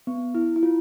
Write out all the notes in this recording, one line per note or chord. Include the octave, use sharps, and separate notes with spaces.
B3
E4
E4
F4